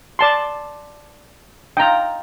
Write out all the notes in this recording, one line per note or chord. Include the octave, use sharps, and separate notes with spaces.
D5 A5 C6
D#4 F4 G5 A#5